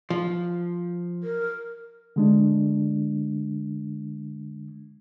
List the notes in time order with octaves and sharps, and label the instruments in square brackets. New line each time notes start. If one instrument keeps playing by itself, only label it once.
[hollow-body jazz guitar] F3
[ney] A#4
[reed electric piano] D3 G#3 D4